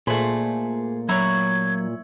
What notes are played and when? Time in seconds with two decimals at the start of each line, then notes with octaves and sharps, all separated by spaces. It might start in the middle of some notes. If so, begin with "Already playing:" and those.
0.07 A#2 A3 G#4 C5 B5
1.09 F#3 E4 C#5 A#5 G#6